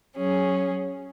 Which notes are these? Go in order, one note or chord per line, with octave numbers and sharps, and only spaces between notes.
F#3 C#4 G#4